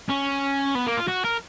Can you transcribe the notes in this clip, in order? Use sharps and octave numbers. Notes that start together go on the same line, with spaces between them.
C#4
B3
A#3
F4
F#4
A#4